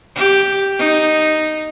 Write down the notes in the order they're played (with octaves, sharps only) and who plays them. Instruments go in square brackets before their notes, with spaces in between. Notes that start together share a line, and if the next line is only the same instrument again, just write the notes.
[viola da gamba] G4
D#4